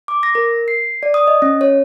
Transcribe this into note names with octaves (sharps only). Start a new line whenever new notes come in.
D6
A#6
A#4
C7
D5
D#6
D#5
C#4
C#5